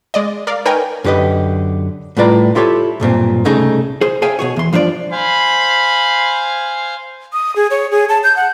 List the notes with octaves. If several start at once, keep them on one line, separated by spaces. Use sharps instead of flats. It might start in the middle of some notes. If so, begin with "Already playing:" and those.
G#3 D5 D#5
A#4 D5 F5
D#4 A#4 B4 C#5 G5 G#5
F#2 D3 G4 B4 D#5
A2 G3 F4 B4 D5 A#5
E4 F4 G4 A4 C#5
B1 G2 A#2 C4
C2 C#3 A3 D#4 G#4
G#4 C5
G#4 C#5 E5 F5 G5 G#5
B2 G#4 C#5
E2 C6
G2 F3 D4 B4 D5
C5 F5 G#5 B5
D#6
G#4
C#5
G#4
A5
G6
F#5